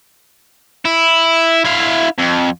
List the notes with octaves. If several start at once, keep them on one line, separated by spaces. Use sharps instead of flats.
E4
E4 F5
F2